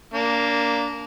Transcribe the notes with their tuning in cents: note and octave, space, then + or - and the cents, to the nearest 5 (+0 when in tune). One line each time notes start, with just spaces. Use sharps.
A#3 +0 D4 -25